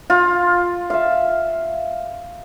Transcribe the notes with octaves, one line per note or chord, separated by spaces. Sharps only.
F4
E5 F5